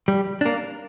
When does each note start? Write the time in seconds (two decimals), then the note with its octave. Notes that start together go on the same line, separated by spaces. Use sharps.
0.08 G3
0.41 A#3 D4